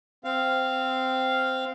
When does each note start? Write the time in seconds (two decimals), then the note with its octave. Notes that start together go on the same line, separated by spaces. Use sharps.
0.24 C4 F5